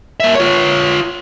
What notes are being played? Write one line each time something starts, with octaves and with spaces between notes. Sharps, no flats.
A#3 E5
F4 C#5